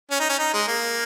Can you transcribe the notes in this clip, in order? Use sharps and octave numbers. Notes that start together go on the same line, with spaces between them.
C#4
D#4
C#4
D#4
G#3
A#3